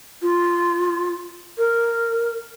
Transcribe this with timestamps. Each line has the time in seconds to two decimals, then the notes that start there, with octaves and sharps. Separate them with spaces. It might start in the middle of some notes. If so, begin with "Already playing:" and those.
0.22 F4
1.57 A#4